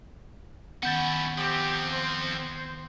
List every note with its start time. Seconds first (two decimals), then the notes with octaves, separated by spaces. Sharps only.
0.83 D#3 B3 C#4 E4 F#5 G6 A6
1.38 F3 C4 G4
1.92 C5